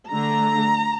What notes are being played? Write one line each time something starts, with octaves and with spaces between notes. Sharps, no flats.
D3 A3 D4 A#5